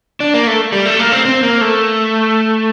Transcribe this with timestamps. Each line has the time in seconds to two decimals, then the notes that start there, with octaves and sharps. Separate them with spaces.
0.20 D4
0.34 A#3
0.47 A3
0.72 G3
0.86 A3
0.99 A#3
1.12 C4
1.25 C4
1.43 A#3
1.61 A3